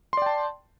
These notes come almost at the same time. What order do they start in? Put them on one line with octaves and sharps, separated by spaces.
C6 D5 G5 A5